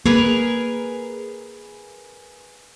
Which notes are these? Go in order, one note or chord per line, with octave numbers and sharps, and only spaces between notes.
A#3 G#4 A#4 B4